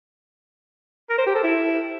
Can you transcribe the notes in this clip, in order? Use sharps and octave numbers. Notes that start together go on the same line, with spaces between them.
A#4
C5
G4
A4
E4